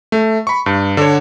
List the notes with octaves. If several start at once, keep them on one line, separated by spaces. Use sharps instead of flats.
A3
B5 C#6
G2
D3 C#5